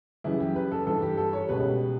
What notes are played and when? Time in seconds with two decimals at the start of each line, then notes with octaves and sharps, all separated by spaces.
0.24 F#2 C#3 E3 G3 E4
0.40 G4
0.56 B4
0.72 A4
0.86 G2 E3 G3 A4
1.02 G4
1.17 A4
1.33 C#5
1.48 C#2 B2 G3 B4